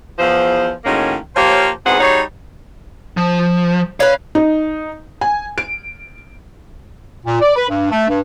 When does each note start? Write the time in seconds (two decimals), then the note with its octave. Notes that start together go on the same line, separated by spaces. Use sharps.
0.18 E2 F3 C5
0.85 A2 D#3 G#3 A#3 C#4 F#4
1.35 F3 A#3 G4 C5 C#5
1.85 E2 G#2 B2 C4 G#4 F#5
2.00 G3 D#4 F#4 G#4 C#5
3.17 F3
4.00 C#4 B4 F5
4.35 D#4
5.21 G#5
5.58 D7
7.26 A#2
7.42 D5
7.56 B4
7.70 G2
7.91 A3
8.09 G2